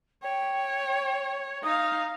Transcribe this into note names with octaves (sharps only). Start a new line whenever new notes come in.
C#5 G5
D#4 F5 D#6